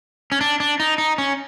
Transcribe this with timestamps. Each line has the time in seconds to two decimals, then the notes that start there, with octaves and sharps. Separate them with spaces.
0.32 C#4
0.41 D4
0.60 D4
0.80 D#4
0.98 D#4
1.18 C#4